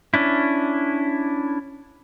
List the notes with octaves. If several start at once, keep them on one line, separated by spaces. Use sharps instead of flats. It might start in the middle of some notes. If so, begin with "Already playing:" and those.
C#4 D4 E4